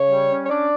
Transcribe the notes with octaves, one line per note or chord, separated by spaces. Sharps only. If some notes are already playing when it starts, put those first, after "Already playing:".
Already playing: C#3 C#5
G3
C#4
C#5
D4 D5